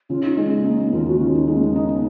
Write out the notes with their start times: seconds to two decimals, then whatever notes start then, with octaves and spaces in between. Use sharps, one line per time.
0.10 C#3 F4
0.24 D#4
0.37 G#3 C#4
0.51 B3
0.65 A#3 D#4
0.79 B3
0.93 D#2 F4
1.07 F#4
1.20 C#3 F4
1.35 D#4
1.47 G#3 C#4
1.57 A#3
1.62 B3
1.76 D#4